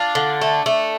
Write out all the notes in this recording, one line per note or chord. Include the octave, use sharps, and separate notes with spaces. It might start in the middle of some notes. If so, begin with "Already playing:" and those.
Already playing: D4 F4
D3
A3
A3